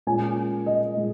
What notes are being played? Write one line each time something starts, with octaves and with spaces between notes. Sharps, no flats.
A#2 G#3 C#4 G#5
D#5
A#2 G#3